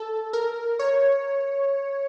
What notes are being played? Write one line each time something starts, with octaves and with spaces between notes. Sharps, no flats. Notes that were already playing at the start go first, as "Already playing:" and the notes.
Already playing: A4
A#4
C#5